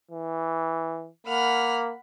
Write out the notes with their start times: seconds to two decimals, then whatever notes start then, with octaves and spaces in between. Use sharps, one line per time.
0.11 E3
1.27 A#3 F#5 B5 F6